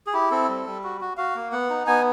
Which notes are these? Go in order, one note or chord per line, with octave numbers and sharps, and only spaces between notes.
G#4
E4 G4
C4 A4
G3
G3
F#4
F#4
F#4 F5
A#3
B3 F#5
D#4
B3 G#5